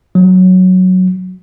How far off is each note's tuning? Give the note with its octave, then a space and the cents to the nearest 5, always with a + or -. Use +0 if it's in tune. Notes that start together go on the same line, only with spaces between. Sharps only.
F#3 +0